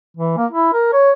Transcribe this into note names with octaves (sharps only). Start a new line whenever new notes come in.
E3
A#3
E4
A#4
C#5